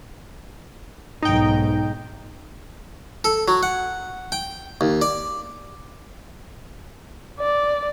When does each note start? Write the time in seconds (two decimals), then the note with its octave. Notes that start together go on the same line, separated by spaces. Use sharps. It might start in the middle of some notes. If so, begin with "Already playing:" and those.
1.23 B1 G#2 D#4 G5
3.24 A4
3.48 F#3
3.63 F#5
4.32 G5
4.81 D#2
5.02 D5
7.40 D5